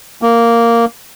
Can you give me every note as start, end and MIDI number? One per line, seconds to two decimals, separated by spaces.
0.22 0.85 58